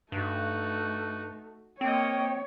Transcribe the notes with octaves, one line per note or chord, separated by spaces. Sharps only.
G2 A3 D#4 F#4
A#3 C4 C#5 D#5 G5